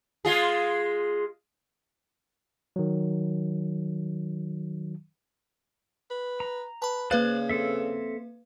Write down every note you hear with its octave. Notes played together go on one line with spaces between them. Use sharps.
G#3 F4 G#4
D#3 F#3
B4
A#5
B4 A5 B5
C#3 A#3 B4 C5 D5 F5 F#6
C4 A4 E5